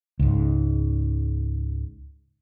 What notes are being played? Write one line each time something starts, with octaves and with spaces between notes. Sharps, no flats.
C#2 G#2